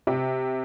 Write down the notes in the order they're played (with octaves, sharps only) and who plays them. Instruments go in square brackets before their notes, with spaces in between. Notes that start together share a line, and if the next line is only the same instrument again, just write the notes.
[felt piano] C3